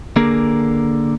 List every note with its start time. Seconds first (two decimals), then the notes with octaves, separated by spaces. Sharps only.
0.16 D3 A#3 G#4 A#4